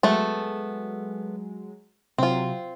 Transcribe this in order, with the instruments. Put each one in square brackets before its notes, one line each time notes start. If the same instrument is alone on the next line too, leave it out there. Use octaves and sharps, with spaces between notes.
[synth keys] F#3 G#3 [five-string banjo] A3 B3 A4
[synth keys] C3 F#3 [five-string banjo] C4 F4